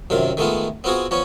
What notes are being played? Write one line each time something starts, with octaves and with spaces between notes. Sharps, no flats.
F#2 C3 D#3 F4
D#3 G#3 A3 B3 F4
B3 C4 F4 F#4 G#4
F3 B3 C#4 C#5